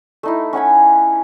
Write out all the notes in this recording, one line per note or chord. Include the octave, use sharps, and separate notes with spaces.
A3 D#4 E4
C#4 F#5 G#5 B5